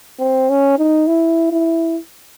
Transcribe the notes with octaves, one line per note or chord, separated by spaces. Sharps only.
C4
C#4
D#4
E4
E4